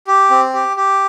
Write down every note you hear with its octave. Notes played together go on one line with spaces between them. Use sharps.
G4
C4
G4
G4